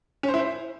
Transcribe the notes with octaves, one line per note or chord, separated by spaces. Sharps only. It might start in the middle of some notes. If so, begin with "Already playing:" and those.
C#4
C5
E4
C5